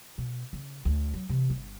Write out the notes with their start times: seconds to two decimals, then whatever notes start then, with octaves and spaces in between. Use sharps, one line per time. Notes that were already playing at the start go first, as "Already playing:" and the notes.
0.18 B2
0.53 C#3
0.85 D2
1.14 F#3
1.29 C3 E3
1.50 G1